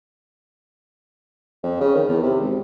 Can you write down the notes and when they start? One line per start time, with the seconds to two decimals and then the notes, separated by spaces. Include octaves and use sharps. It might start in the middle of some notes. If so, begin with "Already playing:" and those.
1.63 F2
1.80 C#3
1.95 D#3
2.08 E2
2.23 C3
2.41 G#1